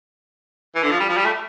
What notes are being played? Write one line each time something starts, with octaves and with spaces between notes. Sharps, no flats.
E3
D3
F3
G3
F3
G3
A3